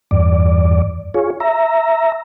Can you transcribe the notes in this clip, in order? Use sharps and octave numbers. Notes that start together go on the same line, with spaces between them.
E2 G2 D5
F4 G#4 C#5
E5 A#5